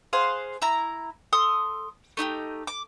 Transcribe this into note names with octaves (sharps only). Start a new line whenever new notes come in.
G#4 C5 F5 F#5
E4 A#5
A4 C6 D#6
A3 D#4 F#4 G4
D6